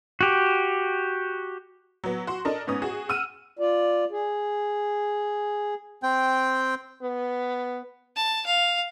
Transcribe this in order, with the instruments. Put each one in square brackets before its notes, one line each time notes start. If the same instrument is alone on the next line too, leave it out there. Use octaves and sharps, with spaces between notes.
[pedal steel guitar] F#4 G4
[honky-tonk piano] F#3 B3
F#4 C6
D4 A4 A#4 D#5
G#2 B3 C#4 D#6
F#4 G#4
F#5 E6 F6 D#7
[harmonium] F4 D5
G#4
[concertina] C4 G5
[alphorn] B3
[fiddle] A5
F5